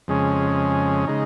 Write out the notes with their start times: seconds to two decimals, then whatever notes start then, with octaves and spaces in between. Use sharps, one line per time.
0.08 F2 C#3 G#3 C#4
1.07 C#3 G#3 D#4